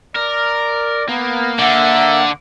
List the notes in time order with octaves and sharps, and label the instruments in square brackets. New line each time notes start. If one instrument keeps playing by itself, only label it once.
[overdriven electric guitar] A#4 [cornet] D5
[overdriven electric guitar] A#3 [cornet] B3
[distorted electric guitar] D3 [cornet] E5 [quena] F#5